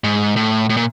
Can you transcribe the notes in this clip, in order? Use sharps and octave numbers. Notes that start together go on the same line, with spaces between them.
G#2
A2
A2
A#2